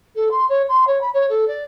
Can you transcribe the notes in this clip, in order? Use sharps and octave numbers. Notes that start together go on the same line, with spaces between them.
A4
C6
C#5
C6
C#5
B5
C#5
A4
D5